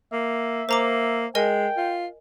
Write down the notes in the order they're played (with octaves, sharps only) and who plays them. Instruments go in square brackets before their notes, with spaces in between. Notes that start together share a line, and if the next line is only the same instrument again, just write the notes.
[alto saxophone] A#3 [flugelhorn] E5
[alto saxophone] A#3 [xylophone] C5 A#5 D6
[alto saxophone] G#3 [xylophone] A#4 D#5 G#5 [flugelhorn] G5
[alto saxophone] F4